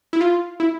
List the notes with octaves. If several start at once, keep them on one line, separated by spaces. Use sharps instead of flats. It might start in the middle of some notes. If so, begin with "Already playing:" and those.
E4
F4
E4